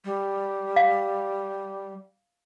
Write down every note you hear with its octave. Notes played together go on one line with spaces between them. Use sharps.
G3
F5